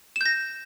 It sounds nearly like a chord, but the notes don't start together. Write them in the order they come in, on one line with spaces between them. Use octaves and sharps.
E7 G6 A#6